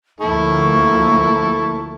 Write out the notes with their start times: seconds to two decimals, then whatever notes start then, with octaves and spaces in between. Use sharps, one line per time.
0.20 D2 F3 A#3 E4 A4 C#6